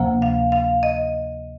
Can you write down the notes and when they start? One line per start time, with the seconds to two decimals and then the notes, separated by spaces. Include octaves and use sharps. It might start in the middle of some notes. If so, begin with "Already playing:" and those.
Already playing: D2 C3 F3 A#3
0.22 F5
0.52 F5
0.83 D#5